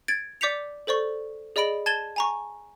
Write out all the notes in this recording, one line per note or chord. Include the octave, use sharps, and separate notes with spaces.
G#6 A6 D7
D5 D6 G6 B6 C#7 F7
A4 C5 D5 C#6
G#4 D5 D#5 B5 D7 F#7
A5 G#6 A6 D#7 E7 G7
G#5 A#5 C#6